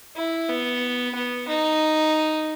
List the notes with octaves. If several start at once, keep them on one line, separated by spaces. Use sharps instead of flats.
E4
B3
B3
D#4